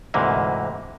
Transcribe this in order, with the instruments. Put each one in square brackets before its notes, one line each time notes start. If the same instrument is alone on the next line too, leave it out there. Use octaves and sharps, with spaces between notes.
[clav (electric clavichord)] D2 G#2 C3 E3 A#3